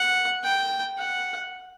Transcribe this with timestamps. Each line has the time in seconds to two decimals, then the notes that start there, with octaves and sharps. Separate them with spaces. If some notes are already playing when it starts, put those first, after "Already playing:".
Already playing: F#5
0.44 G5
0.98 F#5